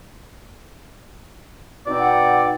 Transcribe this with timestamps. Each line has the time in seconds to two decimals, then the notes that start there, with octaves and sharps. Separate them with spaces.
1.87 B2 C4 D#4 D5
2.00 F#5